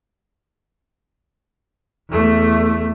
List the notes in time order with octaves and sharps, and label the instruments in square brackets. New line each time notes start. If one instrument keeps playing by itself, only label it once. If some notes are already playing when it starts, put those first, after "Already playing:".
[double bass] E2 A3